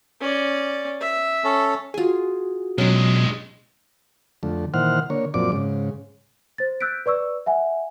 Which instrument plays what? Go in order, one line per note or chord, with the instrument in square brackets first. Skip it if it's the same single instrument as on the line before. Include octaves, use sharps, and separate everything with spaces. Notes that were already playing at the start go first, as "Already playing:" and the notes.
[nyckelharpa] C#4 D5
E5
[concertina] C#4 A4
[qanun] F4 G#5 [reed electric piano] F#4 G#4
[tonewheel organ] B2 [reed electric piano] F#3 [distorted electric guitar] G#3 D4 [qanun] C#4 G5
[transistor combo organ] F2 D3 A3
A#2 D#3 E3 C5 F#5 F6
D3 A#3 C#5
F#2 A#2 F3 C4 D5 D6
G#2 C#3
[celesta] C5 A6
E6 F#6 G6 B6 D7
B4 D5 C#6 E6
E5 F#5 G#5